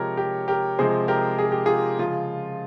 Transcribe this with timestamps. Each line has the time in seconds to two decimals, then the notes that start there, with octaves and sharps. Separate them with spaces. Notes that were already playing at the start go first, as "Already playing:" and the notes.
Already playing: C3 F3 G#3 G4 A#4 C#5
0.17 G4
0.48 G4 A#4
0.79 C3 F3 G#3 G#4 C5
1.08 G4 A#4
1.38 G#4
1.52 G4
1.65 F4 G#4
1.99 C#3 F3 G#3 F4